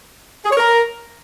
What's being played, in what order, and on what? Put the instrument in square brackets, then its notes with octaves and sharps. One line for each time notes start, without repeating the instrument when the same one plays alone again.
[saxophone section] G#4
C#5
A#4